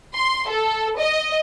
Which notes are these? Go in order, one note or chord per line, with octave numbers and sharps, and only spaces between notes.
C6
A4
D#5